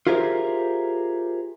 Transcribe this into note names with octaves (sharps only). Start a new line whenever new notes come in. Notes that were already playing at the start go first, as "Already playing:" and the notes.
F4 G4 G#4 A#4 C5 E5